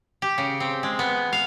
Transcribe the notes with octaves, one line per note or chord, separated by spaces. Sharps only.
G4
C#3
C4
G#3
B3
F5